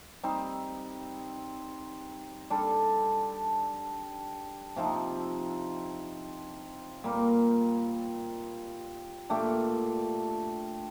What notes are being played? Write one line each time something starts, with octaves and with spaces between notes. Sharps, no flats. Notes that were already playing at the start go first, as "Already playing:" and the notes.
G3 C4 D#4
G3 D4 A4
C3 F3 C4 D#4
A#2 G3 A#3
A#2 A3 D4 G4